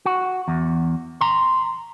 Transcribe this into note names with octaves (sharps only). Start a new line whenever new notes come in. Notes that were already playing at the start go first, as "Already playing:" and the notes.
F#4
E2
A#5 C6